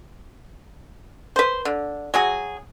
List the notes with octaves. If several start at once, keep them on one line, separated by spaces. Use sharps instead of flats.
B4 C5
D3
F#3 F#4 G#4